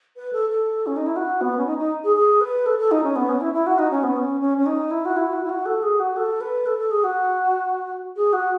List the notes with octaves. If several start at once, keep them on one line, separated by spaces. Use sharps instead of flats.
B4
A4
A4
C#4
D#4
E4
F#4
B3
C#4
D#4
D#4
G#4
G#4
B4
A4
A4
D#4
C#4
B3
C#4
E4
E4
F#4
D#4
C#4
B3
C#4
C#4
C#4
D#4
E4
F#4
E4
F#4
E4
F#4
A4
G#4
F#4
A4
B4
A4
A4
G#4
F#4
G#4
F#4